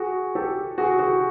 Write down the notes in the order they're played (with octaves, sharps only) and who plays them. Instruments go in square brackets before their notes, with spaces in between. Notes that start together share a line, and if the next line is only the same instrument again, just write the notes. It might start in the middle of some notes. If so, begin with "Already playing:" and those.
Already playing: [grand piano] F#4 G#4
G4 A4
F#4 G#4
F#4 G#4